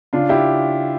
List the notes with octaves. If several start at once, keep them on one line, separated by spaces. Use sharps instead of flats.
C#3 D4 F4
E4 G4